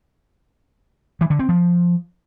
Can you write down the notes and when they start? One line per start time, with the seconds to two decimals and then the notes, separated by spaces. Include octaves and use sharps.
1.21 E3
1.30 D3
1.39 C4
1.49 F3